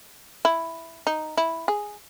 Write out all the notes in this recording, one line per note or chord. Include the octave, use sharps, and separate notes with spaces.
E4
D#4
E4
G#4